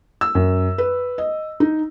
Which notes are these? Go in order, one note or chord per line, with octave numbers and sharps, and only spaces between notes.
E6
F#2
B4
D#5
D#4